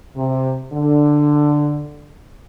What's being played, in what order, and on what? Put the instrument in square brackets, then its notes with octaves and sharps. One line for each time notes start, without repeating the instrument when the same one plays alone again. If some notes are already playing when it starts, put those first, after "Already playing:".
[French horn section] C3
D3